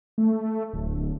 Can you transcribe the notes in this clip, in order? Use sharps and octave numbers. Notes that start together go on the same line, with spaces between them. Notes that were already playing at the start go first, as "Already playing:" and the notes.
A3
D1